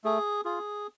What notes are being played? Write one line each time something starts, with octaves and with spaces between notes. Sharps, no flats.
A3 G#4
F4 G#4